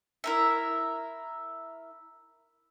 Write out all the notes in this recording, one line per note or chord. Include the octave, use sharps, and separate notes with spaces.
E4 A#4 E5